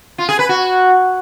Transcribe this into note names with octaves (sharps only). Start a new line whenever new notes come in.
F4
G#4
B4
F#4